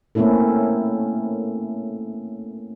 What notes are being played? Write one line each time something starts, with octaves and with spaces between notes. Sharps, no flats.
A3 A#3 C4 C#4 E4 A4